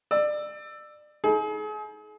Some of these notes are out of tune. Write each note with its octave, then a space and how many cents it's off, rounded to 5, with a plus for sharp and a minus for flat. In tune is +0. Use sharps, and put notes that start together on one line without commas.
D5 +30 E6 +0
D#4 +40 G#4 +40